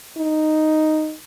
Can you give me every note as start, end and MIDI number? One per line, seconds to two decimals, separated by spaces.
0.18 1.14 63